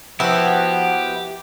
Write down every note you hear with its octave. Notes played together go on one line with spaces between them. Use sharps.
F3 B3 E4 F#4 G4